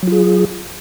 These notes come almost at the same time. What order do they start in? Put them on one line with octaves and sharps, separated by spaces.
F#3 F4 G#4